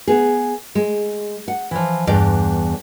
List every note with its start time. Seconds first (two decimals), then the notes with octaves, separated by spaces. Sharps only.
0.08 B3 G#4
0.75 G#3
1.48 F#5
1.71 E3 F3
2.07 E2 G2 D5